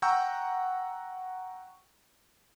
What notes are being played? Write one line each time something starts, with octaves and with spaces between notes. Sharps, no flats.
F#5 G5 A#5 C#6 E6 G6